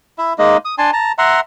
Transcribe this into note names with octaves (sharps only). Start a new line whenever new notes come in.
E4 E5
G#3 A#3 D#4 D#5
D#6
D4 G#5 A5 C6
A5 A#5
E5 F#5 A#5 C6